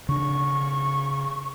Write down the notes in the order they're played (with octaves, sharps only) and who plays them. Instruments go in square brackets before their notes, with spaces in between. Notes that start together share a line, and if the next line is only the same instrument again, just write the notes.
[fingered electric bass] C#3 D4 [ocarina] C#6